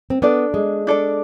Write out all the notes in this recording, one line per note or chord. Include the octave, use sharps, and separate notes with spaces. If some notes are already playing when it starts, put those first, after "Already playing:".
C4
B3 D4 A4 D5
G#3
D4 A4 D5